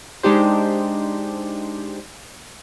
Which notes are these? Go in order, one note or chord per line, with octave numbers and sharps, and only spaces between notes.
G#3 D4 D#4 G4 C5